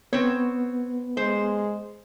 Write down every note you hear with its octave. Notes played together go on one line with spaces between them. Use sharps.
B3 C4 B4 C#5
G#3 C5